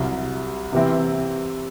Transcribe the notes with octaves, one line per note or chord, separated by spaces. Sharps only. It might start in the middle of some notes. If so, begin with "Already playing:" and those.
Already playing: C2 C3 F#3
C3 E3 C4 E4